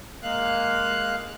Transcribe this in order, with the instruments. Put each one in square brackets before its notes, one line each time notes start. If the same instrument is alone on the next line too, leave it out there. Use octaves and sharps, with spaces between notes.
[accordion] G#3 A#3 F5 F#6